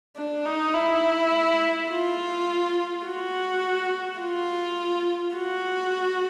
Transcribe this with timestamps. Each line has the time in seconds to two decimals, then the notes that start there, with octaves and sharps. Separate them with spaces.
0.16 D4
0.45 D#4
0.74 E4
1.90 F4
3.06 F#4
4.20 F4
5.35 F#4